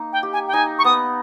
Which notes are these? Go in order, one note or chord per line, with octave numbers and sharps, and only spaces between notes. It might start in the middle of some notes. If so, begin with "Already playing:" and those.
Already playing: A#3 D#4
G5
G4
G#5
G5
D#4 G#5
C#6
B3 D#6